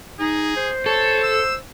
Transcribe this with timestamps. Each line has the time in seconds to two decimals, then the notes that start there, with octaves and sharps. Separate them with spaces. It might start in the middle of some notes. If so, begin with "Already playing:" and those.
0.20 D#4 G#4
0.57 C5
0.86 A4 C#5
1.23 E6